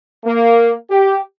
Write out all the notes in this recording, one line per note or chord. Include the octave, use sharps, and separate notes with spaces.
A#3
G4